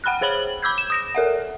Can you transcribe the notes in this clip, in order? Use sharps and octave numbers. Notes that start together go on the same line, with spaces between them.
F#5 G5 B5 F6 F#6
G#4 C5 C#5 B5 F#7
B5 D6 E6 G6 G#6
E7
D#6 A#6 E7
A4 A#4 E5 F#5